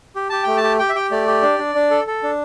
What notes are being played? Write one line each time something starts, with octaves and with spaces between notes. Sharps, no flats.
G4
G4 A5
A3 G5
A5
G4
G4 G5
E5
G4 G5
A3 D5
G4
D4
D4
D4
A4
A4
D4